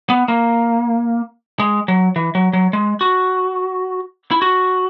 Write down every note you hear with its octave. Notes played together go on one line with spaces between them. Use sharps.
B3
A#3
G#3
F#3
E3
F#3
F#3
G#3
F#4
E4
F#4